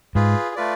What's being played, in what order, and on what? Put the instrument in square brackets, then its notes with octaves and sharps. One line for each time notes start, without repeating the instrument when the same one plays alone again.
[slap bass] G#2 [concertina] F4 G#4 B4
[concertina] A3 F4 B4 D5